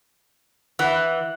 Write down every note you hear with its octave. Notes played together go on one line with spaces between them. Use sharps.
E3 F#5